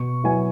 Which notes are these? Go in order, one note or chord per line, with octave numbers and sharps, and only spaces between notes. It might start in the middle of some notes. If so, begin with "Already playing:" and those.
Already playing: B2 C#6
F#3 B3 E4 G#5